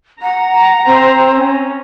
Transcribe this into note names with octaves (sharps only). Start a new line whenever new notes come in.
F#5 A#5
C4 C5
C#4